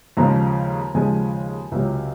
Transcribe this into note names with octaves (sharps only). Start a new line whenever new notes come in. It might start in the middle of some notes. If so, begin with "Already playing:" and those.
D#2 C#3 F3 G#3 A#5
D#2 C#3 F3 G#3 G#5
C#2 C3 F#3